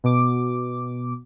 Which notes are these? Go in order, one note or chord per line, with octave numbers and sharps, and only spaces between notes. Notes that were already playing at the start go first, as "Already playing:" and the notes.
B2 D6